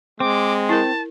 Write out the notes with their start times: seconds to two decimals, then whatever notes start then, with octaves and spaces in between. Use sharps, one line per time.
0.20 G#3 C4 D6
0.69 E4 A#4 A5